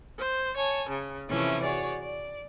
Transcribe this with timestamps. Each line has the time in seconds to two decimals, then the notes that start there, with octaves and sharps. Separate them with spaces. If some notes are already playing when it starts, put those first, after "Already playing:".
0.18 C5
0.55 C#5 G#5 A5
0.89 C#3
1.29 C3 E3 F3 A3 C#4 E4
1.62 F#4 G#4 C#5 D5
2.02 D5